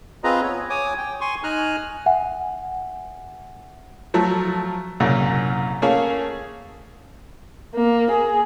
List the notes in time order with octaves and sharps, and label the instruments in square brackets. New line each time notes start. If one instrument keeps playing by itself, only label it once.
[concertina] C4 F4 G#4 B4 D#5 A#5
B3 C#5
C#5 G#5 D6 D#6
G5
G#5 C6 C#6
D#4 G#5 A#5 F6 F#6
[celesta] E5 F#5 G#5
[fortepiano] F3 F#3 A3
C2 F#2 A#2 C#3
A3 A#3 C#4 G#4 C#5 F5
[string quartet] A#3
G#4